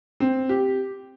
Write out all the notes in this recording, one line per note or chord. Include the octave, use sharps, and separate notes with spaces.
C4
G4